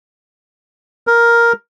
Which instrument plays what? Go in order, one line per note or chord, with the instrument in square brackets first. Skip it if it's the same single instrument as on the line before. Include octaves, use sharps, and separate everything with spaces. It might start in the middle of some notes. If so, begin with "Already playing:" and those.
[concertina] A#4